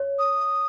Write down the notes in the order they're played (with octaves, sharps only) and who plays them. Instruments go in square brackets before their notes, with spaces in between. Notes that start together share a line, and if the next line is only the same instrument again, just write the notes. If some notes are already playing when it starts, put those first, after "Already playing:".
Already playing: [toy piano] C#5
[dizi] D#6